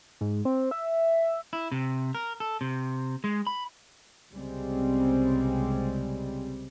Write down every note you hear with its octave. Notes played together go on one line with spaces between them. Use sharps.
G#2
C4
E5
E4
C3
A#4
A4
C3
G#3
B5
C2 C#3 G3 G#3 C4